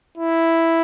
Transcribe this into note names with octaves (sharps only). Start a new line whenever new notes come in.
E4